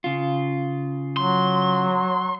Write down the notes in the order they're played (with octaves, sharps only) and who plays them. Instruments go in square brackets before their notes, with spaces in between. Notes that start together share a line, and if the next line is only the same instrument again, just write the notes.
[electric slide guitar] C#3 F4
[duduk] F#3 [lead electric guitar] C6